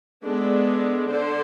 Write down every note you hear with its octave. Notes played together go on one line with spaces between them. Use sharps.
G#3 B3 D4 A4
D3 D4 A4 C5